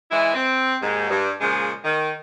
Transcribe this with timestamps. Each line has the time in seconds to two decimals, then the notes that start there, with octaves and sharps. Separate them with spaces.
0.10 E3 G#3 E4
0.34 C4
0.81 D#2 G#2
1.09 G2
1.41 A#2 C#3 F3 G#3
1.84 D#3